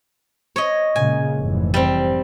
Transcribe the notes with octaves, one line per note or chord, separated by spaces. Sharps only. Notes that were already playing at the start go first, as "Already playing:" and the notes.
C#5 D#5
A#2 C#3 G#3 G#5
F1 G#2 E3
G3 C4